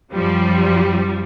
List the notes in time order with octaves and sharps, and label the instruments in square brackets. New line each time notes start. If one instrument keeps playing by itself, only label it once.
[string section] F#2 F3 G3